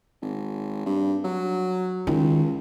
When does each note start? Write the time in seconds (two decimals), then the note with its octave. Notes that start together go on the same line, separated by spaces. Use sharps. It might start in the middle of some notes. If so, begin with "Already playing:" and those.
0.22 G#1
0.86 G2
1.24 F#3
2.07 C#2 D#3